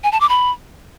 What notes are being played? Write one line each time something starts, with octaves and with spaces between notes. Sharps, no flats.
G#5
A5
D6
B5